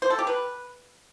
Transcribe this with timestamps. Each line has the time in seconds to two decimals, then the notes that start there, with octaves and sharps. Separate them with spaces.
0.02 C5
0.10 A4
0.19 G4
0.27 B4